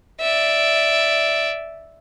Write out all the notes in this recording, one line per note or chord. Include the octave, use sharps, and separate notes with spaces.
D5 E5